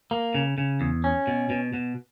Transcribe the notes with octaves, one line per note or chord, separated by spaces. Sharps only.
A#3
C#3
C#3
E2
C#4
B2
B2
B2